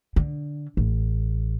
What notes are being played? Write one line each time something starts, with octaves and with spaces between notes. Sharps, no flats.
D3
A1